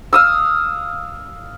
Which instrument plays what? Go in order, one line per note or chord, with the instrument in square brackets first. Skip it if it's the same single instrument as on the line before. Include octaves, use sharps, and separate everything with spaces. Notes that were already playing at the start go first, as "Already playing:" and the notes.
[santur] F5 D#6 E6